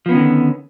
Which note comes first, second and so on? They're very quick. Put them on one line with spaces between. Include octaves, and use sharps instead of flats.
F3 B3 C#4 D#3 D3